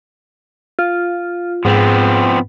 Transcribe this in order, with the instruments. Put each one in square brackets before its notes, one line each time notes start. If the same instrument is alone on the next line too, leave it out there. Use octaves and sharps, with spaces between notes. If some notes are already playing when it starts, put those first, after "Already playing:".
[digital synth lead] F4
[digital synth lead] G#2 [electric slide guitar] F3 B3 C4